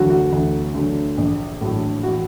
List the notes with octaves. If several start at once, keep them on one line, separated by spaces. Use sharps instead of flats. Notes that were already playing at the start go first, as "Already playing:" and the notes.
Already playing: D2 D3 F#3 F#4
F#4
D2
D3 F#3
A#1
A2 F#3 A3
F#4